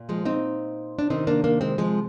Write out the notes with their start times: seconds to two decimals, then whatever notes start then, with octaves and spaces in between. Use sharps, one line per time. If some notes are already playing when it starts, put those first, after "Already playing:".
Already playing: A#2
0.09 F3 G#3
0.25 C4 D#4
0.99 D4
1.10 C3 D#3 C4 D#4
1.27 A#3 D4
1.44 A#3 D4
1.61 G#3 C4
1.78 F3 G#3